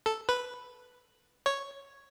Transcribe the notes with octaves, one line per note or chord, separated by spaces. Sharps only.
A4
B4
C#5